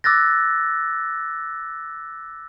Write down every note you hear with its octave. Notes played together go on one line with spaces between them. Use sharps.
D6 E6 F#6 A6 A#6